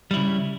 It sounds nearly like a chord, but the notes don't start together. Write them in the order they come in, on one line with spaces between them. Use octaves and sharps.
G3 E4 C#3